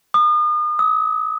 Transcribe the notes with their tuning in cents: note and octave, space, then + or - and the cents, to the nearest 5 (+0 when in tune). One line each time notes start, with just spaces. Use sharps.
D#6 -40
D#6 +40